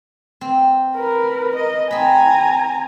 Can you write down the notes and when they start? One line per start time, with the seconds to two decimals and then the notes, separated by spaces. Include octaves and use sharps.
0.41 C4
0.96 A#4 B4
1.56 D#5
1.91 C4 G#5 A#5 B5